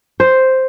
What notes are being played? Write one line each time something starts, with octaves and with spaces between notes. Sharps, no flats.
C5